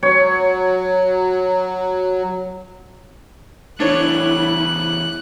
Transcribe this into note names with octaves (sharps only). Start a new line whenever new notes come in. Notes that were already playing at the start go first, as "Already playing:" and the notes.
F#3 C#5
E2 A3 D4 E4 C#5 F#6